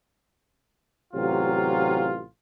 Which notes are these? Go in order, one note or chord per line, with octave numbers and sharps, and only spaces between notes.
A1 C3 F#3 F4